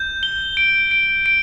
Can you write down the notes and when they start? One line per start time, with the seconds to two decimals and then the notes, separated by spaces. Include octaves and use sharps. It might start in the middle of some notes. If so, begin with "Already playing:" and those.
Already playing: G6
0.23 G7
0.57 D7
0.91 D7
1.26 D7